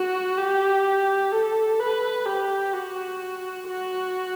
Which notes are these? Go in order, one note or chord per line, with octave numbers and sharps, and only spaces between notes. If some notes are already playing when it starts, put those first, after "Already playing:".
Already playing: F#4
G4
A4
B4
G4
F#4
F#4